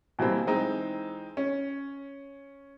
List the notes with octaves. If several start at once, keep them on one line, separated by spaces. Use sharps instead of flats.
B2 E3 G3 A#3 C4
E3 G#3 C4 D#4
C#4